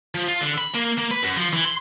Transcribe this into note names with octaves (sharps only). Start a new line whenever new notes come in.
F3
F4
D3
B5
A#3
A#3
B4
F#2
F3
E3
C6